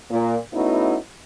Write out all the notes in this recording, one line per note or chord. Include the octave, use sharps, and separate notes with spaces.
A#2
A3 B3 C#4 D#4 E4 F#4